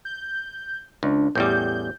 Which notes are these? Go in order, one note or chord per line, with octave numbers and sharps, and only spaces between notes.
G6
C#2 D4
A1 E2 G3 G6